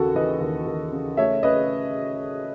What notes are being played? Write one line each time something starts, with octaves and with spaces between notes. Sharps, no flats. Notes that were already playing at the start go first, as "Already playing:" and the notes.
Already playing: D#2 C#3 F#4 A4
E3 B4 D#5
D#2
D#2
C#3
A3 C#5 E5
C#3 B4 D#5